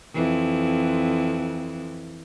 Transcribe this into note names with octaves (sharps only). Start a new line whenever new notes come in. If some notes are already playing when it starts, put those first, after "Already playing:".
F2 E3